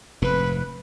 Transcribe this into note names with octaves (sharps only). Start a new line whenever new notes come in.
F1 G#2 B4